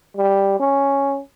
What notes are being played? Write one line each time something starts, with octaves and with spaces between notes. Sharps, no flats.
G3
C#4